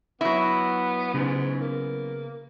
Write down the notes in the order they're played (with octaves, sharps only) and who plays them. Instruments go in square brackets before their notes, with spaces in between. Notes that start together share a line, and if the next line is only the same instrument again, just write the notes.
[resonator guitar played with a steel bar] F#3 E4 [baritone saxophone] B3
[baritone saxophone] G#2 [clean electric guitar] C#3 B3
[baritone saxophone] A#3